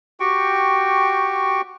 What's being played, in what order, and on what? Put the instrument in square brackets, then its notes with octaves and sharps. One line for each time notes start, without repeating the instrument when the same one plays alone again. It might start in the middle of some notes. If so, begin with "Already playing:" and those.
[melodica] F#4 G4 G5 C#6